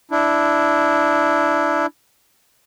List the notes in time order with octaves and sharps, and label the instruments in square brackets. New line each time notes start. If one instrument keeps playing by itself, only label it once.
[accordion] D4 E4